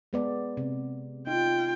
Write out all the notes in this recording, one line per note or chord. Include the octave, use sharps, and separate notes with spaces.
G#3 B3 D5
C3
D#4 F4 G5